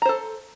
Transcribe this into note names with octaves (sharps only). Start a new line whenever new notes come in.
A4 C5 A#5